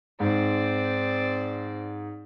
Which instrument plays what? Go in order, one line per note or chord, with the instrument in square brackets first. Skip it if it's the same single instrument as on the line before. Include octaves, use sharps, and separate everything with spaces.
[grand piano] G#2 [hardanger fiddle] C4 D5